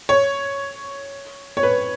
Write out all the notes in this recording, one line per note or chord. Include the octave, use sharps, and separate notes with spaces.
C#5
C#5
B4